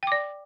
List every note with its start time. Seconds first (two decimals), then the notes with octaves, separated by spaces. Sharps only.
0.03 G5
0.07 D6
0.12 D5